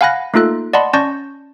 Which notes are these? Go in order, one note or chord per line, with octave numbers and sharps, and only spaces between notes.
F5 F#5 G#5 B5 F#6 A#6
A3 A#3 D#4 F4 A4 F#6
D5 D#5 F#5 A5 B5 C6
C#4 D5 A5 C#6 G6 A#6